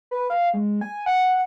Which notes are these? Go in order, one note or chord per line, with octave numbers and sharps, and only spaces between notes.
B4
F5
G#3
G#5
F#5